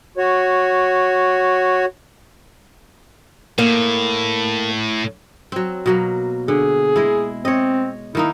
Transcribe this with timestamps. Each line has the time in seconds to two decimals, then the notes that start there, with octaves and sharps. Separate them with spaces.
0.18 F#4 C#5
3.58 A2 A#3
5.52 F#3 C4
5.86 B2 F#3 A#3
6.48 D3 G#4
6.96 G#3 E4
7.45 C4 C#5 D#5
8.15 D#3 A#3 D#4 E4